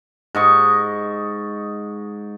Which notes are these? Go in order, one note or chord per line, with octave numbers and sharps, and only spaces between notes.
G#2 D#5 C#6